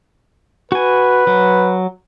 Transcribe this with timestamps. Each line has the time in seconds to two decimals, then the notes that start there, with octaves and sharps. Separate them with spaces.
0.72 F#4 B4 G#5
1.27 F#3